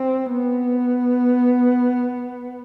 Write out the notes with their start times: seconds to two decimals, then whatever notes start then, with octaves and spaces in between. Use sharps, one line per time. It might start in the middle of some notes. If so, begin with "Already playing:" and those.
Already playing: C4
0.31 B3